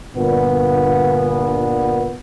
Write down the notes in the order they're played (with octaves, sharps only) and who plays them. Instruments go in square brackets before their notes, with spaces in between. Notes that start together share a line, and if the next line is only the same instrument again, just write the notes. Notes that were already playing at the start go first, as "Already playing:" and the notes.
[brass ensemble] G1 A#2 B3